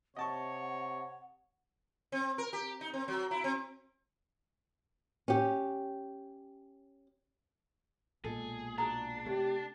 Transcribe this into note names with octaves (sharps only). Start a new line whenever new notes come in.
C3 C#5 D#5 F#5 A5 C#6
C4
A#4
G4
D#4
C4
F#3
E4
C4
C#4 G4
B1 A#2 G#3 G#4 A4
D4 F#4 G#4 A#5
C3 A3 G4 C#5